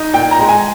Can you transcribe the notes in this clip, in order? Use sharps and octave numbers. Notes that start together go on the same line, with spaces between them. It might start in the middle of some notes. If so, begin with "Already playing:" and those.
Already playing: D#4
A#2 G5
A#5
G#3
G#5